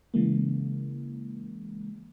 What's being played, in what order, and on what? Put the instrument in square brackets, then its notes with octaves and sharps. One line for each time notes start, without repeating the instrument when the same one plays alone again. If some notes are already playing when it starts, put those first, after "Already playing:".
[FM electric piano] C#3 E3 G#3 A#3